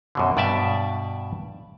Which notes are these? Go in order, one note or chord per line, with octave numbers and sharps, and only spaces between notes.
F#2 B2 D3
G2 B2 D5 E5 A5